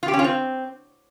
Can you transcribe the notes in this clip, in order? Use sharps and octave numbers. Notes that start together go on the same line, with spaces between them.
F4
G4
C#4
F4
C4